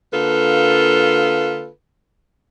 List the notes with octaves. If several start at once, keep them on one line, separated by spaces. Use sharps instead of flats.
D3 A#3 F4 A4 B4